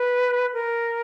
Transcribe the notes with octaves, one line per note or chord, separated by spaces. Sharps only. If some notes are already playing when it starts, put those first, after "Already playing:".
Already playing: B4
A#4